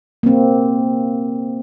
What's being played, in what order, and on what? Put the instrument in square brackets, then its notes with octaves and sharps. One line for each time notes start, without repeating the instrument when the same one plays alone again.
[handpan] A#3 C4